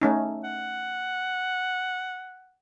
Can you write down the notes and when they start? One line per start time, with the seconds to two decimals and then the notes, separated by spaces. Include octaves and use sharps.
0.01 A3 C#4 D#4
0.44 F#5